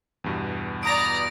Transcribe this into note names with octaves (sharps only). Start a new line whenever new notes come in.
E2 G2 B2
D5 A#5 B5 D#6 A#6 D7